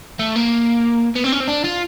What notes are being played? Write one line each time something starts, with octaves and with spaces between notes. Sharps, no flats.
A3
A#3
B3
C4
C#4
C4
D4
F4